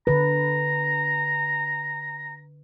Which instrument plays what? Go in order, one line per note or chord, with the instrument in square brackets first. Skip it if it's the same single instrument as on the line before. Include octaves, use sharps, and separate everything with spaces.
[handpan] D3 B4 [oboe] A#5